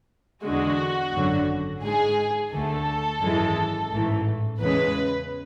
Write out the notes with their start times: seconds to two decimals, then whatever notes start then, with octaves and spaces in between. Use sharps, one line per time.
0.44 E2 D3 G#3 F#4
1.13 G#1 F#2 D3 F#3
1.83 G#2 G#3 G#4
2.52 D2 D3 A3 A4
3.22 G#1 F#2 E3 G#3
3.92 A1 G#2 E3 A3
4.61 E2 C#3 G#3 B4